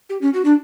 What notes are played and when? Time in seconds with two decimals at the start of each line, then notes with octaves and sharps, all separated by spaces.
0.10 G4
0.22 C#4
0.34 F#4
0.45 D4